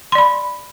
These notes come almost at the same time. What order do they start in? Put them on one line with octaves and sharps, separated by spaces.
C6 D5 B5